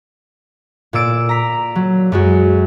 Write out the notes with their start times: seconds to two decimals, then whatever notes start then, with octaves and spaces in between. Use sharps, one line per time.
0.93 A#2 D5 E6 D7
1.29 A#5 B6
1.75 F#3
2.12 F#2 G#3 F#4